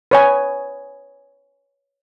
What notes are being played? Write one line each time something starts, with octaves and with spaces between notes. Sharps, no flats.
B4 C#5 G#5